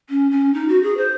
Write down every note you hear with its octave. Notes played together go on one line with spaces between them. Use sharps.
C#4
C#4
D#4
F#4
G#4
C5